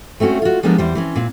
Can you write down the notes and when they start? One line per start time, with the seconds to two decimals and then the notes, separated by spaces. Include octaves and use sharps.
0.20 A3 C4 C#4 F#4
0.42 F4 F#4
0.63 F3 G3 G#3 B3 D4 A#4
0.78 E2 G3 C5
0.95 E3 C4 C#4
1.16 A#2 C4